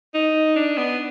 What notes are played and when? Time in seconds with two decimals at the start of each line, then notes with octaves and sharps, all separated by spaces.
0.14 D#4
0.56 D4
0.78 B3